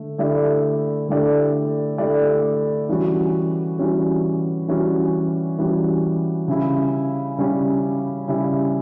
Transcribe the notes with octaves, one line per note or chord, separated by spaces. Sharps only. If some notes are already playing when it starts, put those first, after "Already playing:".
Already playing: D3 A3
D3 A3 E4 G4 D5
D3 A3 E4 G4 D5
D3 A3 E4 G4 D5
E3 G3 C#4 F#4
E3 G3 C#4 F#4
E3 G3 C#4 F#4
E3 G3 C#4 F#4
C#3 G3 C#4 E4
C#3 G3 C#4 E4
C#3 G3 C#4 E4